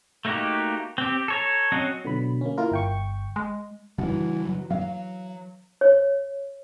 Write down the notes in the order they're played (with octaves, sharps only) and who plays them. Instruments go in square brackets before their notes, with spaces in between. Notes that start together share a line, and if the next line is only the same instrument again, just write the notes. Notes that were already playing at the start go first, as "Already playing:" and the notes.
[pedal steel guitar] A3 A#3 D#4 F#4 G4
C4 G4
A4 C#5 A#5
F#3 C4 C#4 F#4 D#5
[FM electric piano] B2 D3 F#3 B5
A#3 C#4
A#3 E4 F4 A#4
G1 G5 C#6
[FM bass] G#3
[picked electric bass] C#3 G3 D4 [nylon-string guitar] E3 F#4
[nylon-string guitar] F#3
[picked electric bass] F#3 [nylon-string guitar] F5
[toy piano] C#5